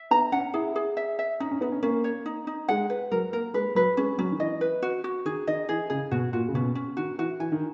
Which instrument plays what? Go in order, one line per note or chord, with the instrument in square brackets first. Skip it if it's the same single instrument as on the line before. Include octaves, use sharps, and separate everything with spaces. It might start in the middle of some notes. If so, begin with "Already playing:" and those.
Already playing: [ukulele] E5
[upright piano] B3 [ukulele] A#5
[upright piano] C#4 [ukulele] F#5
[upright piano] E4 [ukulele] G#4
[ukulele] G#4
E5
E5
[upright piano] C#4 [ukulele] D#4
[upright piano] C#4
[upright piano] B3 [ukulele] D#4
[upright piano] C#4
[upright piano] A#3 [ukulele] C#4
[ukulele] C#5
D#4
D#4
[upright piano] G#3 [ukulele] F#5
[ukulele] B4
[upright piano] F#3 [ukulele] A#4
[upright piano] A#3 [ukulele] A#4
[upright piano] G#3 [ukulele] B4
[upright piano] F#3 [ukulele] B4
[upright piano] G#3 [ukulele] C#4
[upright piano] F#3 [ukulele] C#4
[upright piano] D#3
[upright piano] E3 [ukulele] D#5
[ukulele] B4
F#4
F#4
[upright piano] D#3 [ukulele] G#4
[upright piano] D#3 [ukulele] D#5
[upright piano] E3 [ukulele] G#4
[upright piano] C#3 [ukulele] G#4
[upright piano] B2 [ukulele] F#4
[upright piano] A#2 [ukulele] F#4
[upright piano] C#3
[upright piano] B2 [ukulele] C#4
[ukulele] C#4
[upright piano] D#3 [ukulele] F#4
[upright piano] E3 [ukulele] F#4
[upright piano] E3 [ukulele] G#5
[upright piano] D#3